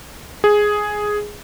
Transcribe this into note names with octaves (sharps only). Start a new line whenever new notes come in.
G#4